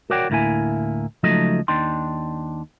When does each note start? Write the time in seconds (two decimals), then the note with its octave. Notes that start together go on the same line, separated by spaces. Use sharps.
0.10 F#4 A#4 C#5 D5 F#5 G5
0.30 D2 A2 A#3 E4 G#5
1.23 C#2 F3 F#3 A3 D#4 D#5
1.68 D#2 D4 D#4 G5 C6